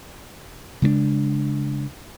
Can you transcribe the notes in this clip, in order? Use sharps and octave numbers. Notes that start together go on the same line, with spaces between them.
C#3 G#3 C4 D4